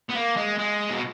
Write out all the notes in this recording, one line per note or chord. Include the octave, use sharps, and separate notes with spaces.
B3
A#3
G#3
G#3
B2